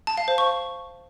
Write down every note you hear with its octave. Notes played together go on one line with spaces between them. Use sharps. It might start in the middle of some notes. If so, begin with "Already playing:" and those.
A5
F5
C5
C#6